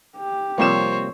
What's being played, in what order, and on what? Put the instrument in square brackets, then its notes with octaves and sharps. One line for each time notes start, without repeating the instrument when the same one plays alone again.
[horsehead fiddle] G4
[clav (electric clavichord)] C3 G3 A#3 [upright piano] F3 C4 E7 [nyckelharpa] C5 C#5